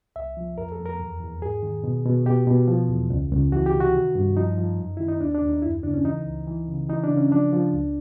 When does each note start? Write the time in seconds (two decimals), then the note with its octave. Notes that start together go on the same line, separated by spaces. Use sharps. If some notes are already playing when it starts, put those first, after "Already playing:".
0.16 C2 E5
0.37 F3
0.58 F2 A#4
0.72 A4
0.79 F2
0.86 A#4
1.00 E2
1.20 E2
1.42 G#2 G#4
1.63 D#3
1.84 B2
2.05 B2
2.26 B2 G4
2.47 B2
2.68 F3
2.89 E2
3.10 C#2
3.31 C#2
3.52 E3 F#4
3.66 G4
3.74 C3
3.80 F#4
3.94 D#3
4.15 G2
4.36 F3 D#4
4.58 F3
4.79 F#2
4.97 D#3 E4
5.08 D#4
5.20 D#2 D4
5.34 D4
5.42 D#2
5.49 D#4
5.62 F#2 E4
5.83 C#3 D4
5.94 C#4
6.05 E3 D#4
6.26 C#2
6.47 E3
6.68 C#3
6.89 E3 D#4
7.04 D4
7.09 C#3
7.17 C#4
7.31 F3 D4
7.53 F3
7.73 C#2